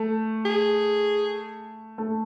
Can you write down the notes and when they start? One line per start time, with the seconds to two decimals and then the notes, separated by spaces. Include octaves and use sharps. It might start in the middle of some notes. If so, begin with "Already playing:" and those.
Already playing: A3
0.45 G#4
1.98 A3